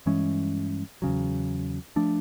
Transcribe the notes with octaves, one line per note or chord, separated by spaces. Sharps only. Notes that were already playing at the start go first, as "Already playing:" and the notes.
G2 E3 G#3 C#4
E2 C#3 F#3
F3 A3 D4